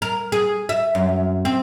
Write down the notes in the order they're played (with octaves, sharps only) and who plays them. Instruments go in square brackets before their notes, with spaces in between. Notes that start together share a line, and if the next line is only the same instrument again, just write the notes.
[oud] A#4
G#4
E5
F#2
C4